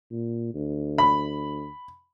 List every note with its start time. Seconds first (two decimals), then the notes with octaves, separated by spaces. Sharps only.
0.11 A#2
0.54 D2
0.98 B5